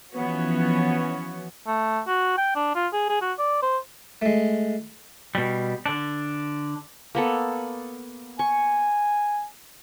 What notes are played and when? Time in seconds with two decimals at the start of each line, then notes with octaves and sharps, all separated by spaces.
0.15 E3 F3 B3 C#4 F#4 C#5
1.67 A3
2.07 F#4
2.38 G5
2.55 D4
2.75 F4
2.93 G#4
3.09 G#4
3.21 F#4
3.39 D5
3.63 C5
4.22 G#3 A3
5.35 B2 G3
5.86 D3 D4
7.15 A#3 B3 A4
8.39 G#5 C#6